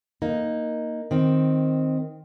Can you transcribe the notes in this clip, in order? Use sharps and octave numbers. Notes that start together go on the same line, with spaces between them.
A#3 D#4
D#3 C4